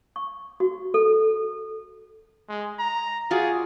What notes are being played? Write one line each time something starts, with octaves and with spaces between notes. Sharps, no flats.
C#6
F#4
A4
G#3
A#5
F4 F#4 G#4 D5